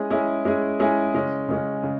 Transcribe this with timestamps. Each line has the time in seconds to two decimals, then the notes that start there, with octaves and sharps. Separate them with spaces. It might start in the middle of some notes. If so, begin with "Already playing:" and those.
Already playing: G#3 C#4 E4 G#4
0.10 G#3 C#4 E4 G#4
0.45 G#3 C#4 E4 G#4
0.80 G#3 C#4 E4 G#4
1.14 C#3 G#3 C#4
1.49 C#3 G#3 C#4
1.83 C#3